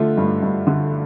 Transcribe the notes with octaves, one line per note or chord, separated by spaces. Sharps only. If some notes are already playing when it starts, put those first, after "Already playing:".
Already playing: D3 A3 F4
G2
G2
D3